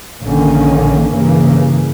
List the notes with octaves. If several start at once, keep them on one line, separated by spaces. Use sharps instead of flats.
A#1 D3 D#3 A#3 C#4
G2 C#3 E3 A#3